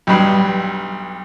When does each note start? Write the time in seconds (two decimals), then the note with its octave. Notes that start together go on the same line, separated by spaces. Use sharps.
0.07 B1 G2